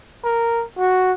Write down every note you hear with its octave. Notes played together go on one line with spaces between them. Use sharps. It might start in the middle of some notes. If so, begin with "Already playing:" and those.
A#4
F#4